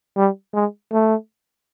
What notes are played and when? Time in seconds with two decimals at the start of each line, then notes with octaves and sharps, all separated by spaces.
0.17 G3
0.54 G#3
0.92 A3